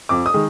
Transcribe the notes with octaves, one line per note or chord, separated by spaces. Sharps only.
F2 D6
D#6
D#3 G#3